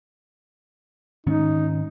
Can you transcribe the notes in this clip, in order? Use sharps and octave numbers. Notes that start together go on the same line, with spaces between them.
G#2 D#3 C#4 D#4